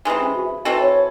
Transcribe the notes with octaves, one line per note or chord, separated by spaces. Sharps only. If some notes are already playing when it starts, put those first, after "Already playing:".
C3 E3 G#3
C#4
F#4
E5
E5
E3 C4 F#4 A4 D#5
C#5